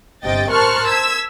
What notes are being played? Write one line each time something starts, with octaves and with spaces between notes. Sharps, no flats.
G1 C3 D#5 G5 A6
A#4 C5 A5 C#6 F6 F#6
E6 G#6 B6